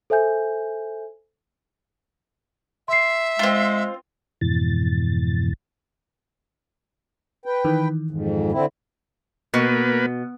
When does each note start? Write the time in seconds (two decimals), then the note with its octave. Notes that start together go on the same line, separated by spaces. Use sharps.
0.10 A4 C5 E5 G#5 G6
2.88 E5 C6 C7
3.39 G#3 C4 F4
4.41 F2 G#2 B2 E3 A6
7.46 B4 G5
7.65 D#3 E3
8.11 F2 G#2
8.52 D3 C4 E4
9.54 B2 A#3 B4